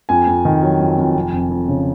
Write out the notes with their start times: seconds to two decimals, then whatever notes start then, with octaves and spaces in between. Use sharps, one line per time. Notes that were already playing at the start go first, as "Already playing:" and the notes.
0.09 F2 G#5
0.27 F2
0.45 D#3
0.63 F#3
0.80 F2
0.98 F2
1.15 F1
1.33 F1
1.50 F2
1.68 C#3